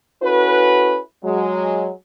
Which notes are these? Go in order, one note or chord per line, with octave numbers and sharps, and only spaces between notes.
C#4 E4 F#4 A4 B4
F#3 G#3